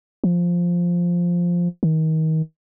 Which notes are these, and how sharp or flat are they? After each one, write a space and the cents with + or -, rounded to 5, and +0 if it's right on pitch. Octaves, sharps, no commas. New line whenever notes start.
F3 +0
D#3 +30